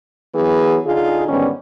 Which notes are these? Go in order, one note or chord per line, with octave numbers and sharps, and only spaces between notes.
E3 F#3 B3 G#4
D3 D#4 F4 G#4
G#2 D3 D#3 G3 B3 C#4